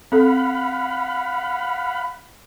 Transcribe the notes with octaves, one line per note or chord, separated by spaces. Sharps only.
C4 A4 F5 F#5 B5